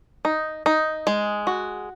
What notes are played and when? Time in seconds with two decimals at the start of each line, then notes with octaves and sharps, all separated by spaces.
0.25 D#4
0.66 D#4
1.07 G#3
1.47 F#4